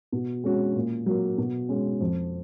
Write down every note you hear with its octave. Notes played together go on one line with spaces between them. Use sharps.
B2
G#3 C#4 F#4
A#2
F#3 A#3
B2
G#3 C#4
F2